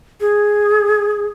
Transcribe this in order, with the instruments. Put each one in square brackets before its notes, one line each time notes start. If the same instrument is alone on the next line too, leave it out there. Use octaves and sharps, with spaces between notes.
[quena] G#4